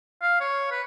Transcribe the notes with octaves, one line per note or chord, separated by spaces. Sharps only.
F5
C#5
B4